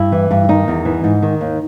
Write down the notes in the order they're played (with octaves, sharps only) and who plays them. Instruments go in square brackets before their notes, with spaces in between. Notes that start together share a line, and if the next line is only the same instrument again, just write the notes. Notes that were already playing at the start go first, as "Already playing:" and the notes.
Already playing: [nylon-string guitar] G2 E4
E3
G2
D#3 D#4
E2
E3
G#2
D#3
D#2